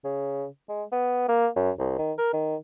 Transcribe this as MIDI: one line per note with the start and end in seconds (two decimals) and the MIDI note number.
0.05 0.46 49
0.69 0.83 56
0.92 1.28 59
1.28 1.48 58
1.56 1.71 42
1.79 1.97 36
1.98 2.13 51
2.18 2.32 70
2.33 2.56 51